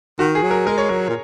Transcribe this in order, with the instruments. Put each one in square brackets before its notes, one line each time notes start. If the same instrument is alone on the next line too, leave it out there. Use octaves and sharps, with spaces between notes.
[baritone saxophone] D#3 [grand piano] F#4
[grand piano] G#4
[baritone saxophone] F#3
[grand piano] A#4
[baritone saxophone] G#3 [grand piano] A#4
[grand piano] C#5
[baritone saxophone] F#3 [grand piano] A#4
[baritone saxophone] A#2